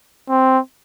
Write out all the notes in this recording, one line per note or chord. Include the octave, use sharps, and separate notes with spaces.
C4